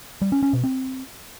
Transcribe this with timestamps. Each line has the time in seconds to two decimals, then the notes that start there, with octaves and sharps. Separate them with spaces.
0.22 G3
0.32 C#4
0.43 C#4
0.53 B2
0.64 C4